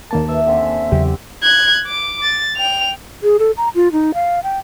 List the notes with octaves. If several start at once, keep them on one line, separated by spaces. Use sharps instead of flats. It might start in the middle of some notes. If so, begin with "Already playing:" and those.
D#2 A#3 A#4 A5
B4 E5
D3 C4 C#4 E5
E2 C#3 F#3 G4
F#6 G#6
D6
A6
G5 F7
G#4
A4
A#5
F4
D#4
F5
G5